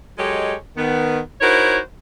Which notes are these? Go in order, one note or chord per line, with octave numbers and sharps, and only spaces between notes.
F#3 G#3 G4 A4 C#5 D#5
D#3 B3
D#4 E4 F#4 A#4 C5 C#5